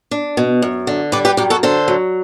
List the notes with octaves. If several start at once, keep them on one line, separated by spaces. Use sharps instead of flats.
D4
B2
F#2
D3
G3 B4 D5
G4 B4
F#2 G4
F#4 A4
D3 A4 C5
F#3